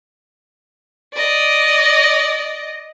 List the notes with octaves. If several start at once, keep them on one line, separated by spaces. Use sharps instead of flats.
D5 D#5